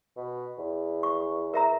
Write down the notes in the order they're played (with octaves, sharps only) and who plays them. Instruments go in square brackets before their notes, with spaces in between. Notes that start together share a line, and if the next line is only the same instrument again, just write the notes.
[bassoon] B2
E2
[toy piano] C#6
A#4 E5 A#5